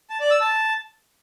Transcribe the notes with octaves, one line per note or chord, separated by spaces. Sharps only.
A5
D5
E6
A5